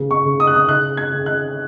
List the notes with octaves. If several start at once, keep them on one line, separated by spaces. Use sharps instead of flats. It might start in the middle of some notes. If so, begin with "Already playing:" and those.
Already playing: C#3
C#6
C#3
D#6
F#6
D#6
C#3 F#6
G#6
C#3
F#6